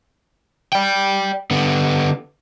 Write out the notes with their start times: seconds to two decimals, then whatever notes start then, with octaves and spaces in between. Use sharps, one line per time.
0.73 D5 G5
1.51 D3 B3